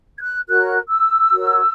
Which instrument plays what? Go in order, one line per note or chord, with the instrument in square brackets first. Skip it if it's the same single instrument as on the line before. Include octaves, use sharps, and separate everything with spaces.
[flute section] G#6
F#6
F#4 A#4 C#5 F#6
E6
F#4 A#4 C#5